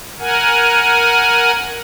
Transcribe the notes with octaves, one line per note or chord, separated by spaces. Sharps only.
A#4 F#5 G#5